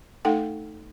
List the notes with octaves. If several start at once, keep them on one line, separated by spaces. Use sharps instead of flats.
A3 D#4 A4 F#5 G5